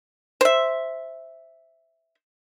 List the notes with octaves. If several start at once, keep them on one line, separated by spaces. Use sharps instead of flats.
C5 E5